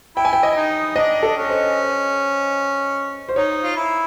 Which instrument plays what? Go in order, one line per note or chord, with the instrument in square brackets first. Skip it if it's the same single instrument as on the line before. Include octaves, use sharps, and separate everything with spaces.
[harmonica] E4 [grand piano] G5
[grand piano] G#5
G5
D#5
[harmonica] D#4
[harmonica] D4 [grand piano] D#5
[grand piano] A4
[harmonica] C#4
[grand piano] C5
C5
[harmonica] D#4 [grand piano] C#5
[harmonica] F4
E4